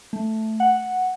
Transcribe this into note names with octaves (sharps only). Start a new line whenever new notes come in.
A3
F#5